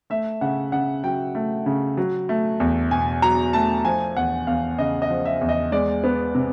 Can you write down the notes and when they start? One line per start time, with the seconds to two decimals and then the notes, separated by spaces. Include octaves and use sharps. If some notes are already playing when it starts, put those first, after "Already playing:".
0.10 A3 E5
0.41 C#3 F#5
0.72 C#3 F#5
1.04 F#3 G5
1.35 A3
1.66 C#3
1.97 F#3
2.29 A3
2.60 E2
2.91 B2 G#5
3.22 F#3 A#5
3.53 A3 A5
3.85 F3 G#5
4.16 E2 F#5
4.47 E2 F5
4.79 C#3 D#5
5.02 D#5
5.10 F3
5.26 E5
5.41 E2
5.49 D#5
5.72 G#3 D5
6.04 B3
6.35 C3